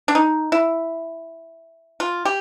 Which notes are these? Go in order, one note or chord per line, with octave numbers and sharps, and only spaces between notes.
D4
D#4
E4
F4
G4